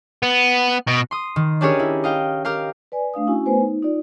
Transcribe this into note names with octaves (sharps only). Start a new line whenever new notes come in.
B3
B2
C6 D#6
D#3
C#4 D4 G4 G#4 A#4 C#5
E4
D#5 F5 G5
G4 A#4 F5
B4 D5 G#5
A3 D4 F5 D#6
C#4 E4 F#4 G#5
A3 B3 B4 C5 G#5
D#4
D#4 F4 D5